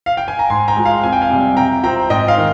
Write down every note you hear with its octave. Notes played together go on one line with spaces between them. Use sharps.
F5
G5
G#5
A#5
G#2 G#5 C6
G5 A#5
F3 G#3
F5
F2 G#5
G5
F5 G#5
C3 G3
C3 G5 A#5
F3 C4 G5 A#5
G#2 D#5 G5
F5
D#3